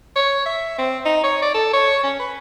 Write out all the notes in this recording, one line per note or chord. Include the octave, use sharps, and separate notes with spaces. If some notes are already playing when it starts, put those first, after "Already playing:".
C#5
E5
C4
D#4
C#5
D5
A4
C#5
C#4
B4